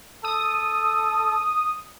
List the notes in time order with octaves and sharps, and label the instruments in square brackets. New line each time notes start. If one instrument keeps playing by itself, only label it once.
[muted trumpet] A4 [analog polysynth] D#6